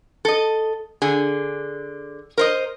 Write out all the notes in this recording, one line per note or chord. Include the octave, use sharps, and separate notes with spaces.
A4 D#5
D3 G#4
A#4 C5 D#5